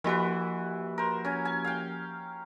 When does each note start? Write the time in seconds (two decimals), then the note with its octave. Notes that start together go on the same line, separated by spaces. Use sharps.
0.04 E3 F3 A#3 F#4 G4 B4
0.98 A#4 C5
1.25 C#4 G#5
1.45 G#5
1.65 F5 G5